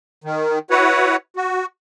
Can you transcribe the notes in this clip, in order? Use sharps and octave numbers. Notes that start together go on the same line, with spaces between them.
D#3
E4 F#4 B4 C#5 F#5
F#4